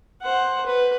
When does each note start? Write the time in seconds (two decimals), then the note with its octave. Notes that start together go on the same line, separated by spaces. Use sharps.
0.22 C5 F#5
0.66 B4